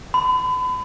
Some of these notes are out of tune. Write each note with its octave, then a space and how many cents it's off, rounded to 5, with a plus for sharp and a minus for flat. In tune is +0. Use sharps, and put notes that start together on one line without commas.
B5 +35